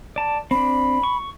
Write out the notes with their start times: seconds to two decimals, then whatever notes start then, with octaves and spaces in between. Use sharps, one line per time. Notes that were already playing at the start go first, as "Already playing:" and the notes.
0.16 D5 A5
0.51 C4 D4 B5
1.03 C#6